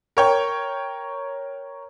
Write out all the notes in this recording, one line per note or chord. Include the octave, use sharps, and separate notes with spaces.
A#4 C#5 G5